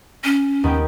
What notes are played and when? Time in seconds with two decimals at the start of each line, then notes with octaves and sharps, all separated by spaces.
0.24 C#4
0.64 D#2 B3 G5